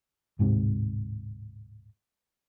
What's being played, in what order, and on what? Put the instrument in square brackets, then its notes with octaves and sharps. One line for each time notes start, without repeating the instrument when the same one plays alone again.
[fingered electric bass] D1 G#2 C3